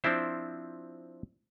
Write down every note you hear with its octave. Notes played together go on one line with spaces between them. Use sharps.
F3 C4 D4 E4 C5